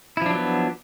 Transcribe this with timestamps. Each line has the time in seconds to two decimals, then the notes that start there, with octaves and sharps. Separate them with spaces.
0.17 E4
0.22 F3
0.26 D4
0.30 F#3
0.35 B3